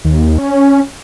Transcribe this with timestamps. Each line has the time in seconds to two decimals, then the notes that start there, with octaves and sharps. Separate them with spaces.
0.05 D#2
0.38 C#4